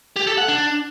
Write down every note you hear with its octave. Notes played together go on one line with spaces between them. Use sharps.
G4
A4
F#5
D4